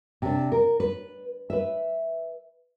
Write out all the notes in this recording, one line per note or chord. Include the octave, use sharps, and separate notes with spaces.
C3 D4
A#4
B4
B4 E5